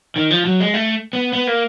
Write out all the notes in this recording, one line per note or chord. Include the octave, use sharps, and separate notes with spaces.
D#3
F3
F#3
G#3
A3
B3
B3
A#3